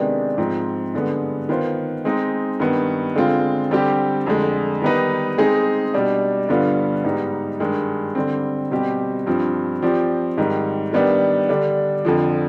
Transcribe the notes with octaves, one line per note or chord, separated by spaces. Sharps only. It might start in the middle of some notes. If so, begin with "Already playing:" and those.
Already playing: C3 D#3 G#3 B3 D4
G#2 F3 C4
G2 D3 G#3 B3
D#3 B3 F4 C5
G#3 C4 D#4
G2 D#3 B3
D3 G#3 C4 F4
D3 G3 C4 G4
F2 D3 G#3
D#3 G3 B3 D#4 B4
G#3 C4 D#4 G#4
B2 G3 D4
G2 D3 G3 B3 F4
G#2 G3 B3 D#4
G2 D#3 G#3
D3 G3 C4
B2 G3 C4 G4
G2 F3 C4
F3 C4 G4 D5
G#2 D#3 G3
D#3 G3 B3 D4
D3 G3 D4
F2 D3 F3